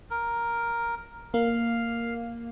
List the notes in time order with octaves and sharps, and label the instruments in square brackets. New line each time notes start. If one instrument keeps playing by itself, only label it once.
[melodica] A#4
[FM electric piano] A#3 [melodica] F5